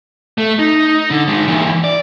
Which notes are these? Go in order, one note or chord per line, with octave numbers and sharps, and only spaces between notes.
A3
D#4
D3
D#3 G#3
E3 A#3
D5